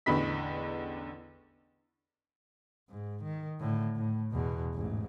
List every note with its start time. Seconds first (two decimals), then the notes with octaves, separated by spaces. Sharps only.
0.06 A1 E2 D3 B5 B6
2.90 G#2
3.24 D#3
3.60 A2 D3
3.95 A2
4.32 E2 B2
4.74 A1 G#2